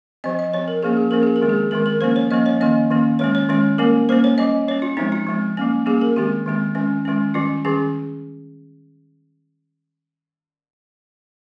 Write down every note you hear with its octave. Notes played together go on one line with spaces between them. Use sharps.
F3 C4 D#5
D#5
F3 C4 C#5
A#4
F3 A#3 C#4 G#4
G#4
F3 A#3 C#4 A#4
G#4
A#4
D#3 G#3 C4
G#4
D#3 G#3 C4 A#4
A#4
F3 A#3 C#4 C5
C#5
F3 A#3 C#4 D#5
C#5
D#3 A#3 C#4 D#5
D#3 A#3 C#4
D#3 G#3 C#4 C#5
C#5
D#3 G#3 C#4 C#5
G3 A#3 C#4 A#4
G3 A#3 C#4 C5
C#5
G3 C#4 D#5
G3 C#4 C#5
F4
F3 G#3 C4 D#4
F4
F3 G#3 C4
G3 A#3 C#4
G3 A#3 C#4 G#4
A#4
D#3 G#3 C4 G4
D#3 G#3 C4
D#3 G#3 C#4
D#3 G#3 C#4
D#3 G3 C#4 F4
D#3 G3 C#4 G#4